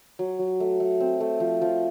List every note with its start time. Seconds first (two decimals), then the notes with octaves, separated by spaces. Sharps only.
0.19 F#3
0.39 F#3
0.60 A3
0.80 A3
1.00 C4
1.21 A3
1.40 F3
1.62 F3